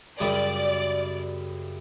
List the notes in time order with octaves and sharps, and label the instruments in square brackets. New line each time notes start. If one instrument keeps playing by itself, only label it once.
[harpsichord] F#2 C#3 G3 [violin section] D5